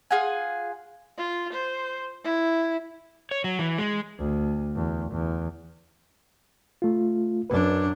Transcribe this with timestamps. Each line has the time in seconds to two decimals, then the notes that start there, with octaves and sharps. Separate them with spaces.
0.11 F4 G#4 F#5 G#5
1.17 F4
1.53 C5
2.24 E4
3.31 C#5
3.44 F#3
3.59 E3
3.78 G#3
4.18 D2
4.75 E2
5.12 E2
6.82 A3 F4
7.50 F#2 D4 B4 D5